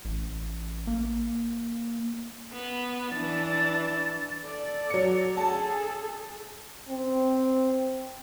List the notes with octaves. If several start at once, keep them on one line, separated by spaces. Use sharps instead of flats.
A1
A#3
B3
E3 D4 A6
A4 D5
F#3 C#7
G#4 A4 A5
C4